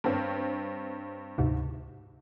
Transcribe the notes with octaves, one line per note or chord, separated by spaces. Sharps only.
G2 C4 C#5
D2 G#2 C3